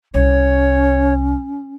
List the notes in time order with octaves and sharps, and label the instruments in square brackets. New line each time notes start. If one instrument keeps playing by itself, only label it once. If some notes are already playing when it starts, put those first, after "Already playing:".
[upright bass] C2 [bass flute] C#4 [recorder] C#5